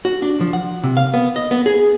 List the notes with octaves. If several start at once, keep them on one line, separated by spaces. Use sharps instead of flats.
F#4
D4
F3
F#5
C3
F5
B3
D#5
B3
G#4